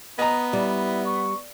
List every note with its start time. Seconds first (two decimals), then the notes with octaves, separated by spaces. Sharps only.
0.19 B3 D#5 A#5
0.53 G3 E4
1.06 C#6